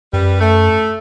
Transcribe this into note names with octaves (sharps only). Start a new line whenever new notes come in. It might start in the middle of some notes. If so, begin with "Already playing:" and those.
F#2 G3 B4
A3